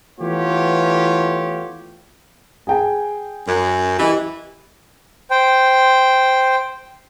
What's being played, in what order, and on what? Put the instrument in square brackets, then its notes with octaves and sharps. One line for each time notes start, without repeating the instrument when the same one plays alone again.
[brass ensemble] E3 A3 B3 F4 G4 C#5
[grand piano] G#4 G5 G#5
[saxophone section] F#2
[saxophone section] E3 [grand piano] G4 D#5
[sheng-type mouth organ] C5 G5